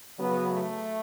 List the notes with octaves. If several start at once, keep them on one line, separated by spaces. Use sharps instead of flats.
C#3 F#3 B3
A3